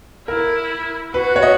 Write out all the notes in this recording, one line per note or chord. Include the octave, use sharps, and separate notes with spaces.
E4 A#4
F#4 B4
C#5
D#5